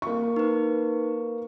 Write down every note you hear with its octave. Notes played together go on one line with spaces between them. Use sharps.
A#3 C#6
D#4 B4